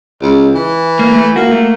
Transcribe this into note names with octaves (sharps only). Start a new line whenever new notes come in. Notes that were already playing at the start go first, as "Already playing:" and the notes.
C#2
E3
A#3
A3
A#3 F#4
A3